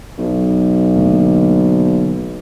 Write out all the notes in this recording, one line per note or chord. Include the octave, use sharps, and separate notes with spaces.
B1
D3 A3 A#3